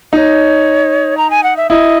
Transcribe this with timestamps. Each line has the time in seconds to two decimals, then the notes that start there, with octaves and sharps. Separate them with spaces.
0.13 D#4 C#5 D#5
1.17 A#5
1.30 G#5
1.43 F#5
1.57 E5
1.70 E4 D#5